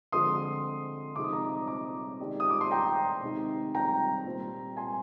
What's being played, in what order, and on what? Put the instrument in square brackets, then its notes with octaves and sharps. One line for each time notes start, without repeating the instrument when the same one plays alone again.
[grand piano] D3 F3 G#3 C4 [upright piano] C6 D#6
[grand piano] C3 F3 G#3 D#4 [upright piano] D6
[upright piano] D#6
A#5 D6
A#5 D6
[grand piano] D#3 G#3 D#4 G4 D5
[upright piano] D#6
D6
C6
G5 A#5
[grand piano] C3 D#3 G#3 D#4 G#4
[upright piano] G5 A#5
[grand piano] A#2 G3 C4
[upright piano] G#5 C6